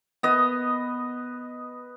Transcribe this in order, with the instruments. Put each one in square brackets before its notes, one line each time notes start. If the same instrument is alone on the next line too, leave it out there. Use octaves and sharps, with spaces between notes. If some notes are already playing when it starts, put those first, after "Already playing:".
[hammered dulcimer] B3 D#5